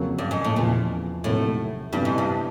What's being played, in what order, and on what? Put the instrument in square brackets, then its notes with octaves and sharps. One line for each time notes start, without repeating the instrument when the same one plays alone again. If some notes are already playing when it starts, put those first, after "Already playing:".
Already playing: [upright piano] F2 C#3 F#3 A#3 C#4
[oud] G2
G#2
A2
[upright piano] E2 C#3 F3 [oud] A#2
[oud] A2 [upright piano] C3 D#3 F#3 A3
[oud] G2 [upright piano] C3 E3 G3 B3 D4
[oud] G#2
G2